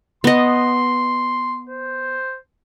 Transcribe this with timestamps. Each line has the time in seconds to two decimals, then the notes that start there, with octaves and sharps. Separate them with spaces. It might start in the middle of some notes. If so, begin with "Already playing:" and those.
0.24 B3 D#5 C6
1.69 C5